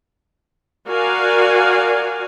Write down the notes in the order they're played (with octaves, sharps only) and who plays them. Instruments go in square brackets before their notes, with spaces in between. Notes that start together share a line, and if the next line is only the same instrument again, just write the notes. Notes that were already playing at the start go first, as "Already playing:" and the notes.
[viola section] F#4 A#4 D5 F5 F#5 G#5